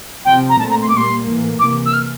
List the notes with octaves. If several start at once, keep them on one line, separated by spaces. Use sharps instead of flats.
C3 F3 C4 G5
A#5
A#2 A3 C4 A5
A#5
C6
D6
A#2 G3 A#3 C6
A2 E3 A#3
C3 E3 A#3 D6
E6
F6